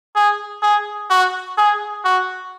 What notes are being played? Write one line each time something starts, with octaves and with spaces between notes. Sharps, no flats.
G#4
G#4
F#4
G#4
F#4